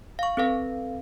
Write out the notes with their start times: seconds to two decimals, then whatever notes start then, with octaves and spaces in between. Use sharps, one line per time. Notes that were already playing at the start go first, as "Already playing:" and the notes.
0.19 F5 C#6
0.37 C4 A4 B4 F5